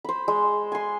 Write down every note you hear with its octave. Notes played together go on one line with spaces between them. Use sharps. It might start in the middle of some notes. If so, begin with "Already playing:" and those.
C5 B5
G#3
G#5 C6